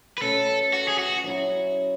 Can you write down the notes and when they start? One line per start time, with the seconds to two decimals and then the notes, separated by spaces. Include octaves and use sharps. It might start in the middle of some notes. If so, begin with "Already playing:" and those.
0.18 B4
0.21 B2 A3 C#4 A4
0.73 F#4
0.88 G#4
0.99 F#4
1.24 F#3 C#4 E4